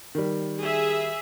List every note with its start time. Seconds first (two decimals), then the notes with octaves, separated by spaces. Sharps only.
0.15 D#3 G3
0.61 G#4 E5